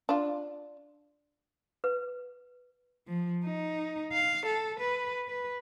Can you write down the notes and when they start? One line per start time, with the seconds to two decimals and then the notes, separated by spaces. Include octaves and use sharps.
0.09 D4 F4
1.84 B4
3.08 F3
3.45 D#4
4.13 F5
4.46 A4
4.80 B4
5.28 B4